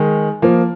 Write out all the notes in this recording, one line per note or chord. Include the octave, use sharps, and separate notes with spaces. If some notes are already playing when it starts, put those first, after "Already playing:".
Already playing: D#3 G#3
F3 A#3